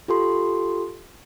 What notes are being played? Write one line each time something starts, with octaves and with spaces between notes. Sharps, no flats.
F4 G4 A4 C6